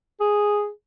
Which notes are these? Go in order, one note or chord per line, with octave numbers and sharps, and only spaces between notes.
G#4